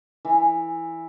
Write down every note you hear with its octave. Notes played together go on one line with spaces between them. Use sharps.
E3